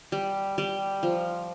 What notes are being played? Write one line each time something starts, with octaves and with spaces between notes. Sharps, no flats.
G3
G3
F3